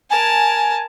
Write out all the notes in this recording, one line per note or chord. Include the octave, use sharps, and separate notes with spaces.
A#4 G#5 A5